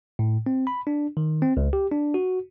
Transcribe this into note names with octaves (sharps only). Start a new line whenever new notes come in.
A2
C4
B5
D4
D#3
C4
C#2
G4
D4
F#4